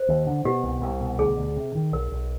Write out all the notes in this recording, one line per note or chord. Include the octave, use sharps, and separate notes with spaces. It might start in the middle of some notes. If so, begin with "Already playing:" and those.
Already playing: C5
D#2
D3
B2 G4
C2
C2
B2
D2 G#4
D2
C3
D#3
B1 A#4
B1